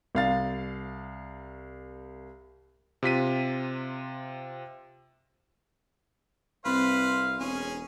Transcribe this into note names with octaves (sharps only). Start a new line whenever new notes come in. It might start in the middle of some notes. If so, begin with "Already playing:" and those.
C2 F5 A6
C3 F4 B6 D#7
C2 C4 B4 C5 F5 B5
E1 C#4 G#4